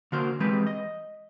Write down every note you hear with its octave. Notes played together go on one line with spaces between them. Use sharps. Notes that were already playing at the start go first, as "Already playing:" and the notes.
D3 A#3 F#4 A#4 C5
E3 G3 G#3 C4 G4 B4
D#5